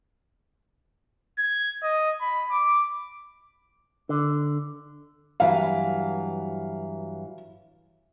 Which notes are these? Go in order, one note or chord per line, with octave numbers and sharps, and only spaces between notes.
G#6
D#5
B5
D6
D3
G2 E3 F#3 F5